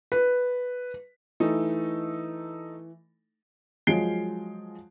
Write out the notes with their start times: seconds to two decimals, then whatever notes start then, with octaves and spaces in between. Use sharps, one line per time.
0.12 B4
1.40 E3 A3 D#4 A4
3.87 F3 F#3 G#3 C7 D7 G7